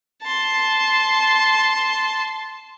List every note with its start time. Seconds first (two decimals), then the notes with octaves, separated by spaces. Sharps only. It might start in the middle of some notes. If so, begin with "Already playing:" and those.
0.22 A5 C6